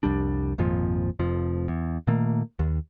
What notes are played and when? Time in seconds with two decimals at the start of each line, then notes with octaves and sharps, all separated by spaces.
0.03 C2 F2 G3 D4
0.58 G#1 F2 A#2 F3
1.19 F1 F2 F3
1.68 E2
2.07 A#2 D#3 A3 A#3
2.59 D#2